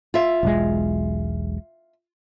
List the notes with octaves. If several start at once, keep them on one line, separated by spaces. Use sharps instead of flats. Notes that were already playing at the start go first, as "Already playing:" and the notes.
F4 E5
E1 B1 G#3